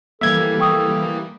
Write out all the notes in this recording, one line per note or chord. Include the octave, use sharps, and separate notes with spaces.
E3 G3 A#3 A4 E5 G#6
G5 C#6 D#6